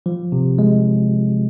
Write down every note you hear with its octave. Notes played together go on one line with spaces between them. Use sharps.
F3
C3
G#3